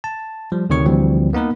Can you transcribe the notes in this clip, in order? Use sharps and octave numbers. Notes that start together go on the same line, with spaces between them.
A5
F3 G3
D2 C3 D#3 C#5 C#6
D2 E3 F3 G3 C4
A#3 B3 D#4 A#4 B4